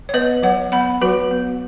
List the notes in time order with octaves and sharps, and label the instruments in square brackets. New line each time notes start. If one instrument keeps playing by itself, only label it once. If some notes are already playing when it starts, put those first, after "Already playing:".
[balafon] C#5
B3 B4 D#5
F#3 C#5 F#5
B3 F#5 B5
F#3 F#4 B4
B3